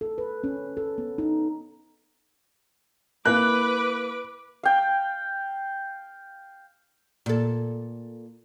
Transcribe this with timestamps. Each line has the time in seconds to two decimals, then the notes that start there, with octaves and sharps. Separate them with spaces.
0.01 A4
0.18 B4
0.44 C#4
0.77 A4
0.98 B3
1.18 D#4
3.25 A#3 E4 B4 F5 D6 F#6
4.63 F5 G5
7.26 A#2 A4